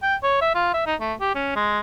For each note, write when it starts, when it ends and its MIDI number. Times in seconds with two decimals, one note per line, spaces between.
0.02 0.15 79
0.23 0.39 73
0.41 0.51 76
0.54 0.71 65
0.74 0.84 76
0.86 0.95 63
1.00 1.14 57
1.20 1.34 67
1.35 1.54 61
1.56 1.80 56